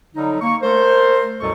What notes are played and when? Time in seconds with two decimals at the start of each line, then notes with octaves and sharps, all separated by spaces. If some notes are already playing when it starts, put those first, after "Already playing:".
0.15 D3 F#3 G3 D#4
0.41 A#3 C#6
0.62 A3 A#4 C5
1.41 C2 F#2 B2 F#3 A4 C#6